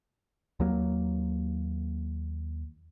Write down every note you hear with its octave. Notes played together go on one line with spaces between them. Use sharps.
D#2 F#3 A#3